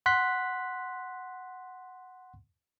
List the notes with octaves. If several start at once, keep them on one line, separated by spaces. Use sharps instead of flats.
F#5 C6 F#6 B6